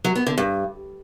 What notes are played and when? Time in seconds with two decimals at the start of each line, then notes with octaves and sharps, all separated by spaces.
0.04 F#3
0.16 B3
0.27 D3
0.38 G2